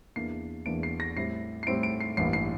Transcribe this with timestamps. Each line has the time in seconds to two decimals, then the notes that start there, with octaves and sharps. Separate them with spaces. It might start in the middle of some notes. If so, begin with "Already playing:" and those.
0.16 E2 E3 A#3 D4 C7
0.66 E2 E3 A#3 D4 D7
0.83 C7
1.00 A#6
1.16 A2 G3 C4 E4 C7
1.63 C7
1.67 A2 G3 C4 E4 D7
1.83 D7
2.00 C7
2.17 A1 G2 E3 A#3 E4 C7
2.33 C7